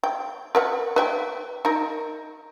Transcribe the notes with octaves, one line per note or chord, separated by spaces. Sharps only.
G5
A#4 B4 F#5
B4 E5 G5
D#4 A#4